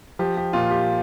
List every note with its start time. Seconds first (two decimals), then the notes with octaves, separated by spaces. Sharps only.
0.19 F3 G4
0.37 G4
0.53 A#2 F4
0.71 G4